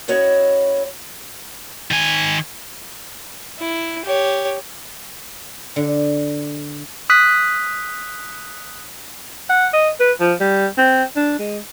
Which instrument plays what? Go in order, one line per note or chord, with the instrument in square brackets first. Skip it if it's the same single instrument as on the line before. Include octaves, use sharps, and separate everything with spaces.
[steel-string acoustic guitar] C#4 E4 F#4 C#5 D#5
[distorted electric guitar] D#3 G#5
[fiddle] E4
G4 C#5
[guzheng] D3
[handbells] D#6 F#6 B6
[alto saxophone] F#5
D#5
B4
F3
G3
C4
D4
G#3